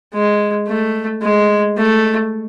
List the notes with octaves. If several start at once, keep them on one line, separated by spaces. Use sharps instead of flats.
G#3
A3
G#3
A3